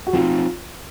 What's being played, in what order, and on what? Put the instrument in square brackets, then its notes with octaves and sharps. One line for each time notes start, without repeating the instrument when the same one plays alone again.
[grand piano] F#4
[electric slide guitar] F3 C4 D#4 [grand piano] F4